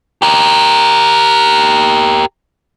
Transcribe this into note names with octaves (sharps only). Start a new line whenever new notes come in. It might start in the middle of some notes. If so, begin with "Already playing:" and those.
G4 A#4